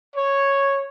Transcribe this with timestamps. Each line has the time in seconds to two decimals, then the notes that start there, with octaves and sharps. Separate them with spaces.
0.16 C#5